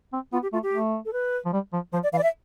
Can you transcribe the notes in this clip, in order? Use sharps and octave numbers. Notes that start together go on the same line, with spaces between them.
C4
B3 F4
G4
A3 F4
G4
A3
A4
B4
F3
G3
F3
F3 C5
D5
E3 F5
D5
E5